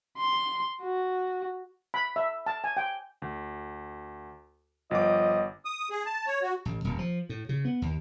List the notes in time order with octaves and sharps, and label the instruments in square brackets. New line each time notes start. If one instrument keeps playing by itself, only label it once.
[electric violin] C6
F#4
[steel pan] B5
E5
A5
G#5
G5
[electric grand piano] D2
[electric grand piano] G1 D6 [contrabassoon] F3 [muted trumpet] D#5
[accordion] D#6
G#4
A5
C#5
F#4
[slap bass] A1
D#1
F3
A2
C#3
B3
D#2